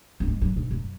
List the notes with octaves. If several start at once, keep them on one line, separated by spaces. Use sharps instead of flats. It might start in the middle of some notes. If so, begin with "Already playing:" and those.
B3
G#3
F#3
G#2
F#2